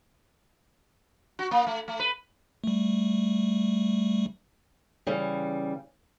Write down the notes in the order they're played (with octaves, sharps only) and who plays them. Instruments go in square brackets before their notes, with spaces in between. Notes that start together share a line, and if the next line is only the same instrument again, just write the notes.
[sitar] F#4
A#3
A3
A3
B4
[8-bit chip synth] G3 A3
[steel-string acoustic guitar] C#3 E3 G3